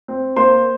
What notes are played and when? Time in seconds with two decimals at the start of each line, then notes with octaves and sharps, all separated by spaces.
0.08 C4
0.36 A#3 C5 C6